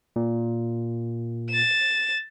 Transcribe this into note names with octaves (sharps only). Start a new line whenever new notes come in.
A#2
A6 E7